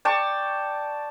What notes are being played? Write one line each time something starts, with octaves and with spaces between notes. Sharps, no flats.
D5 G5 A5 C#6